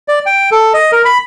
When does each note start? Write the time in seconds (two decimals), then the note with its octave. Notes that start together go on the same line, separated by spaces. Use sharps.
0.08 D5
0.26 G5
0.52 A4
0.74 D#5
0.92 A#4
1.05 B5